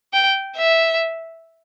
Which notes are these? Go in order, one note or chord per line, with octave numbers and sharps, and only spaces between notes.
G5
E5